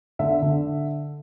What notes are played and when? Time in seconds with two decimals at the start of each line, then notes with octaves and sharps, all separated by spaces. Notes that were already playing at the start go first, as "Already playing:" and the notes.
0.19 D3 E5
0.42 D3